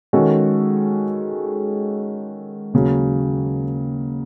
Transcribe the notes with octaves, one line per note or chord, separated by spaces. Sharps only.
D#3 G#3 C#4 F#4 A4
D#2 C#3 F#3